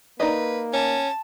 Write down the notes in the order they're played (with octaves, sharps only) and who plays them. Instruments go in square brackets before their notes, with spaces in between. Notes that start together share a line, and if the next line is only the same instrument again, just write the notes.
[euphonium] A#3 [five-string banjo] D#4 D5 D#5 [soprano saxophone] B4
[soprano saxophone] C#4 [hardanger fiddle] A5